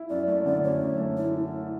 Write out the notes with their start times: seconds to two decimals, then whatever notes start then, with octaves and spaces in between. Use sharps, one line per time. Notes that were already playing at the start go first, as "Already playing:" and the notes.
Already playing: E4
0.10 F#2 D5
0.27 A3 D5
0.45 D3 D5
0.64 F#2 C#5
0.81 F#2
1.00 A3
1.17 E4